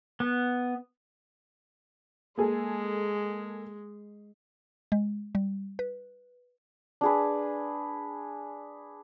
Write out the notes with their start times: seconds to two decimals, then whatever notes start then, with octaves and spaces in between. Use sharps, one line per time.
0.20 B3
2.38 G#3 A#3 G#4 A4
4.92 G#3
5.35 G3
5.79 B4
7.01 D4 G#4 B4